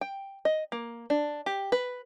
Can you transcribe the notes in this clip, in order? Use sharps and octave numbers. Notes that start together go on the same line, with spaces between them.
G5
D#5
A#3
D4
G4
B4